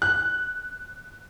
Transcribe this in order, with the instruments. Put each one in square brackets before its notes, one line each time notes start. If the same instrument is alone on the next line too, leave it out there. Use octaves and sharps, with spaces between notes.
[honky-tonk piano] F#6